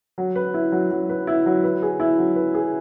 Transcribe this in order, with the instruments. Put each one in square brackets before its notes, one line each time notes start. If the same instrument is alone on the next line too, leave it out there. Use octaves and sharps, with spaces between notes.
[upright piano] F#3
B4
E4
F#3
F#3
B4
E4
F#3
B4
G#4
E4
F#3
B4
G#4